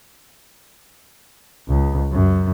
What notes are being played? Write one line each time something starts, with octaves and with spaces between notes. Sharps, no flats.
C#2
F#2